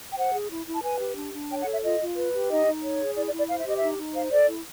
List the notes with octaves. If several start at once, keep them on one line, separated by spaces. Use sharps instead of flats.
G5
C5 F#5
G#4
E4
E4
A5
B4 G#5
G4
D4
D4
C#5 G5
F#5
A4
E5
F4 D#5
F4
B4
G4
D#4 D#5
D#4
C#5
G#4
E4 D5
D5
E4
D5
C5 F5
E5
G4 D#5
E5
D#4
D#4
C5 F5
A4 D5
E4